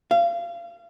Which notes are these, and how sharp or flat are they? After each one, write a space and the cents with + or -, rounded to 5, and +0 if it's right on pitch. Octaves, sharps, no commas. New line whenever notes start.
F5 -30